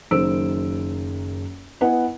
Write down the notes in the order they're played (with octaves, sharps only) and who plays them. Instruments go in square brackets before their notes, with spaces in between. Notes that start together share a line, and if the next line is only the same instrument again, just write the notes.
[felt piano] F#1 F#2 D#3 C5 E6 D7
B3 E4 B4 D#5 F#5 G#5